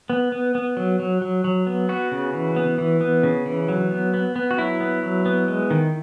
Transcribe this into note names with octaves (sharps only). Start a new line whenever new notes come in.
B3
B3
B3
F#3
F#3
F#3
F#3
B3
B3 F#4
C#3
E3
B3
E3
B3
C#3
E3
F#3
B3
B3
B3
F#4
F#3 E4
B3
F#3
B3
G#3
D#3